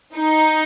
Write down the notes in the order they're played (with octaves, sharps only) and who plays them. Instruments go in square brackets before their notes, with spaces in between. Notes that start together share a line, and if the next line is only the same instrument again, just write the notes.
[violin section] D#4